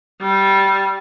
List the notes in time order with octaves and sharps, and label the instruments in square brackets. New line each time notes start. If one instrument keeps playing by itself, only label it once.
[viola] G3